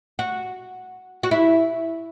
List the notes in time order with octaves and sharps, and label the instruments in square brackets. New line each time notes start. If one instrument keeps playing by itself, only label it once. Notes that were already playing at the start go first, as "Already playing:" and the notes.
[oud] F#4
F#4
E4